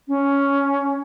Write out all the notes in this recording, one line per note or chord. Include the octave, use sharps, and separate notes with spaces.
C#4